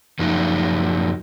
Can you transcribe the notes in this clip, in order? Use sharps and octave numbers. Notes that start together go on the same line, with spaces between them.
F#2 F3 D#4